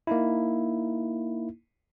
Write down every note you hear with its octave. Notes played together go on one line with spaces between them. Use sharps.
A#3 D#4 E4